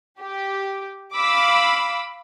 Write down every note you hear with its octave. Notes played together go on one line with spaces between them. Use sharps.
G4
F5 B5 D6 E6